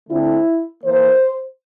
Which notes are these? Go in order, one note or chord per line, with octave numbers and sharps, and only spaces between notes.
D3 A3 C4 E4
E3 A#3 C5